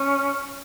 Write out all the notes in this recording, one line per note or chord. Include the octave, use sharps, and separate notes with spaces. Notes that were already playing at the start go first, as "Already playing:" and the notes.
Already playing: C#4